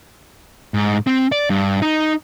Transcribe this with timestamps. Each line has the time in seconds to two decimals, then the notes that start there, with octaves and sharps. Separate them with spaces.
0.74 G#2
1.07 C4
1.32 D5
1.50 G2
1.82 D#4